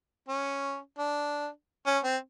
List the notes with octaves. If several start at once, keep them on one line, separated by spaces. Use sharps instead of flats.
C#4
D4
C#4
C4